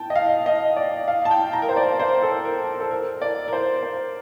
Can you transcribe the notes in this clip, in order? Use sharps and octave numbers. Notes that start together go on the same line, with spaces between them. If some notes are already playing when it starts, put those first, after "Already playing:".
Already playing: G5 A5
D#5
F5
D#5
D5
F5
A5
G5
A#5
A#4
C5
D5
C5
A4
A#4
A4
A#4
D5
A#4
C5
C5